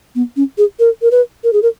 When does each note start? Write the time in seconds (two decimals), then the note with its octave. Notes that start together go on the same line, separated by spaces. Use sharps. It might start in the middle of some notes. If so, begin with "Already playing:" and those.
0.15 B3
0.36 C#4
0.58 G#4
0.79 A#4
1.02 A#4
1.11 B4
1.44 A#4
1.53 G#4
1.63 A#4